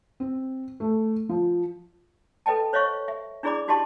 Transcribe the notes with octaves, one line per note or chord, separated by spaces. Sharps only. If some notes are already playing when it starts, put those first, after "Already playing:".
C4
A3
F3
A4 B4 D#5 G5 A5
C5 C#5 D#5 F5 C#6
E5
D4 E4 G#4 D5 B5 D6
D#4 F#4 G4 D#5 A5 C6